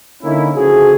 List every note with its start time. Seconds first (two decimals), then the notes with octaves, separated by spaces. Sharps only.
0.23 D3 A#3 C#4 D#4 E4
0.56 C#3 F3 A3 F#4 G#4